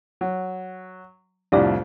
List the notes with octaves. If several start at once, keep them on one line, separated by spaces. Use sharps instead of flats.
F#3
C2 F2 A2 D4 G4 D5